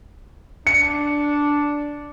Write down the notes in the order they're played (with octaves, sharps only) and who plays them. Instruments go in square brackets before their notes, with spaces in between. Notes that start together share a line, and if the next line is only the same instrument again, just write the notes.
[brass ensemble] D4 [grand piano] C#7